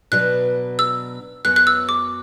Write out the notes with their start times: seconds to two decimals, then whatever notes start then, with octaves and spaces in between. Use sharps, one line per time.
0.12 B2 F#3 D4 B4 F#6
0.79 E6
1.45 F#2 F#3 B3 F#6
1.56 F#6
1.67 E6
1.89 D6